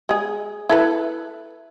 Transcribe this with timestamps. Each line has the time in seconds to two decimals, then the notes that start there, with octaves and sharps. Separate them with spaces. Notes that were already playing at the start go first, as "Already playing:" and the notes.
0.09 G#3 G#4
0.69 E4 A4 B4